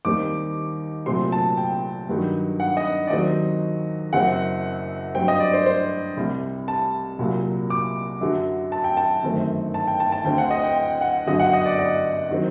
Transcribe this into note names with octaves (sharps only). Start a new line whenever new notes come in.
D#2 D#3 G3 C4 D6
C2 A#2 F#3 A3 C4 C6
A5
G5
G2 D#3 F#3
F#5
D#5
D5
D#2 D#3 F#3 C4 D#5
F#1 F#2 F#3 C4 F#5
G2 F#3 C4 G5
D#5
D5
C5
C5
C2 C3 G3
A5
C2 A#2 F#3 A#3
D6
F#2 D3 F#3
A5
G5
A5
G1 F#2 D#3 A3 C4
A5
G5
A5
A5
D2 D3 A3 C4 G5
F#5
D#5
G5
G5
F#5
G1 F#2 D3 F#3 D#5
F#5
D#5
D5
D#5
D#3 F#3 C4